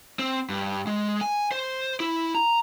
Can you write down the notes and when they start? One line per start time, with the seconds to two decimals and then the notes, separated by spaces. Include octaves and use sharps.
0.19 C4
0.50 G2
0.87 G#3
1.21 G#5
1.52 C5
2.00 E4
2.35 A#5